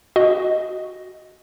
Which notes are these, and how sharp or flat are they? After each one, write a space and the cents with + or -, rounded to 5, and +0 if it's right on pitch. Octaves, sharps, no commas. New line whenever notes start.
F#4 +0 D#5 +0